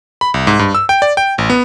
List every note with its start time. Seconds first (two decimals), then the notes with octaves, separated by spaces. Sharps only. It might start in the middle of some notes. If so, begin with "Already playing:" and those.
0.21 B5
0.34 C2
0.47 G#2
0.59 G2
0.75 E6
0.89 G5
1.02 D5
1.17 G5
1.38 A1
1.50 B3